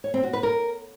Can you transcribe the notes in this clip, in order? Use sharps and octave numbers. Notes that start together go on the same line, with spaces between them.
C#5
C4
F#4
B4
A#4